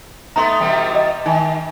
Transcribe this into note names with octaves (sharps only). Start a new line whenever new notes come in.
A3 B3 D#4 A#5 C6
B2 E3 G3
D#5
D#3 D#4